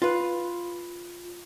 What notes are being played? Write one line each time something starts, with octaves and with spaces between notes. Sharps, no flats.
F4 B4